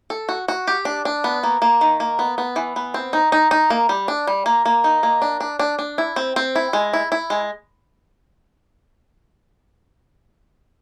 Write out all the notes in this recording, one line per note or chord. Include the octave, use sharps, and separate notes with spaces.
A4
F#4
F#4
G4
D4
D4
B3
A#3
A#3
D#3
A#3
B3
B3
E3
B3
C4
D#4
D#4
D#4
A#3
G3
D4
G3
A#3
A#3
D#4
A#3
D4
D4
D4
D4
E4
C4
C4
E4
G#3
E4
E4
G#3